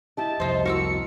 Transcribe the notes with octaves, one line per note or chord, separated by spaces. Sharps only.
E4 G4 D#5 A5
C2 F2 D#4 C5
F#4 A#4 D6 E6 C#7